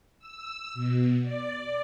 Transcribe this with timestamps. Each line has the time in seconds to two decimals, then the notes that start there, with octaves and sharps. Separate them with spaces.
0.19 E6
0.74 B2
1.22 D5